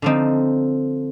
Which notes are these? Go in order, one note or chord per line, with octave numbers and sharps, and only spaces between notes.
D3 F3 C4 D#4